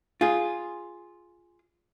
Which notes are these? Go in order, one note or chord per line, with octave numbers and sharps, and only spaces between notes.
F4 G#4